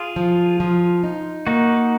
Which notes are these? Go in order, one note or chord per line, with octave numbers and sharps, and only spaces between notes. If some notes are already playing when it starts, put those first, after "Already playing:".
Already playing: F4 G#4
F3
F3
D#4
A#3 D#4 F#4